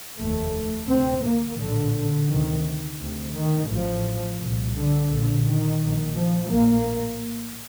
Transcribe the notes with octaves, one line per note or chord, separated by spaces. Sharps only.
F1 D#2 A3
D2 C3 C4
A#3
A#1 A2 D3
D2 C3 D#3
D2 C3
D#3
A1 A2 F3
C2 A#2
D3
A#1 A#2
D#3
A#1 A#2
F3
A#1 A2 A#3